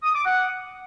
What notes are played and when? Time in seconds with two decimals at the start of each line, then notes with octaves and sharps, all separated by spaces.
0.03 D#6
0.14 D6
0.25 F#5